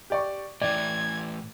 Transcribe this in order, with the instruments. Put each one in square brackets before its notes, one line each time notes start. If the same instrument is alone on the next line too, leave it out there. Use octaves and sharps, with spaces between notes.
[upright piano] G4 D5 C#6
[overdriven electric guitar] A2 E3 [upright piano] D5 G5 [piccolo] G#6